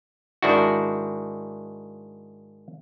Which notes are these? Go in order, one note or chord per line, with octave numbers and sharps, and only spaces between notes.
G#2 D#3 D4 E4 F#4